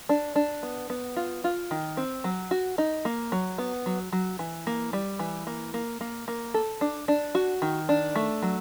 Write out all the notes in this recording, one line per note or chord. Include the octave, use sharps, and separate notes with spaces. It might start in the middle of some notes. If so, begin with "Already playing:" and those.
D4
D4
B3
B3
F4
F4
D#3
C4
F#3
F#4
D#4
A#3
F#3
B3
F#3
F#3
E3
A#3
G3
E3
A#3
A#3
A#3
A#3
A4
D4
D4
F#4
D#3
D4
A3
F#3